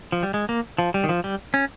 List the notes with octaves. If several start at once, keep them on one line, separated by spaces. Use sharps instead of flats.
F3
G3
G#3
A#3
F3
G3
D#3
F3
G3
C#4